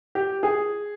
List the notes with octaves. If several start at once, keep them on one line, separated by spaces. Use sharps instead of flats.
G4
G#4